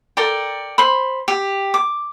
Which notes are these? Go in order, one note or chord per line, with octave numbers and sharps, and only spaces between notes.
A4 A#4 D5 G5
C5 B5
G4
D6